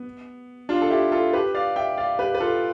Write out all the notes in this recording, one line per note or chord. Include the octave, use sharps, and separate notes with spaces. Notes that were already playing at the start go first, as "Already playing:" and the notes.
Already playing: B3
D4 F4
A4
E4 G4
F4 A4
G4 B4
D5 F5
E5 G5
D5 F5
G4 B4
B4
F4 A4